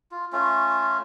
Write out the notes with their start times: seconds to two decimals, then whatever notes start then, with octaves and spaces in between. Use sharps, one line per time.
0.11 F4
0.33 A3 C#4 F4